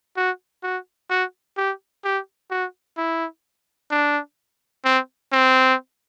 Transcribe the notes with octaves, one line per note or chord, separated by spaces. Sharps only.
F#4
F#4
F#4
G4
G4
F#4
E4
D4
C4
C4